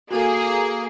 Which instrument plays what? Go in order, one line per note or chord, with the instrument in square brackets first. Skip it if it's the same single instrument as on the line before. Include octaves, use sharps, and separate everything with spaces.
[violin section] A#3 G#4 [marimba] F#4 A4